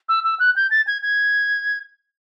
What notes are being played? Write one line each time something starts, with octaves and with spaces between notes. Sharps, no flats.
E6
E6
F#6
G6
A6
G#6
G#6